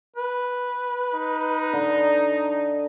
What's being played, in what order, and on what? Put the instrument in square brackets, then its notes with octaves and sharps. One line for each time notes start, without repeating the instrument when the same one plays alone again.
[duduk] B4
[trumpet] D#4
[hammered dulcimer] D3